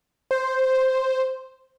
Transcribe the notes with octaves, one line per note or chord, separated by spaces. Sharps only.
C5